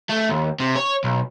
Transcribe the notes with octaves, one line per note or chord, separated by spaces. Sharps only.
A3
D#2
C3
C#5
B1